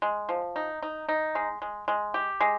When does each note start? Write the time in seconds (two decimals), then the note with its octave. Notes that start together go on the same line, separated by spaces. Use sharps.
0.02 G#3
0.29 F3
0.56 D#4
0.82 D#4
1.09 D#4
1.35 G#3
1.62 G#3
1.88 G#3
2.14 G4
2.41 G#3